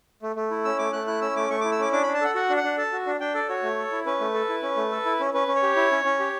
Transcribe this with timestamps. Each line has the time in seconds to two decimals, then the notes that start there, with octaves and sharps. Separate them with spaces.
0.22 A3
0.36 A3
0.51 E4
0.65 C#4 E6
0.79 A3 D6
0.93 A3 F#6
1.07 E4 F#6
1.21 C#4 E6
1.36 A3 D6
1.50 A3 C#6
1.61 E4 D6
1.72 E6
1.79 C#4 D6
1.92 D4 D6
2.03 D4 B5
2.14 A5
2.21 A4 F#5
2.35 F#4 F#5
2.50 D4
2.57 F#5
2.64 D4
2.77 A4 A5
2.92 F#4
3.06 D4
3.20 D4 G5
3.35 A4 D5
3.49 F#4 C#5
3.63 A3
3.78 A4
3.92 E4
4.06 C#4 B4
4.21 A3
4.34 A4
4.49 E4
4.62 C#4
4.77 A3
4.92 A4
5.06 E4
5.20 C#4
5.34 C#4 B4
5.48 C#4
5.55 C#5
5.63 G4
5.76 E4
5.92 C#4
6.05 C#4
6.20 G4